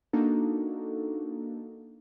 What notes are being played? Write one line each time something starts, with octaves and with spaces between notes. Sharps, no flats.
A#3 D4 D#4 F#4 A4